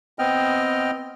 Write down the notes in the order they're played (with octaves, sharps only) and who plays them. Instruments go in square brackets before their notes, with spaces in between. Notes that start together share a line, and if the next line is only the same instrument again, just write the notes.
[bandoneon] B3 C4 D#5 G5 F6